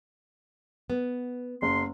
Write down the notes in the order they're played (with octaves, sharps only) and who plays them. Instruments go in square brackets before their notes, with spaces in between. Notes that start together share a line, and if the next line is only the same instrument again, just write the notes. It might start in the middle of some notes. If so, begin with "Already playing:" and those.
[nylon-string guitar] B3
[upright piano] F#1 [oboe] C6